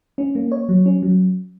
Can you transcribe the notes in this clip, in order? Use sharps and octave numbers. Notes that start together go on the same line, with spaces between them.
C#4
A#3
C#5
F#3
C#4
F#3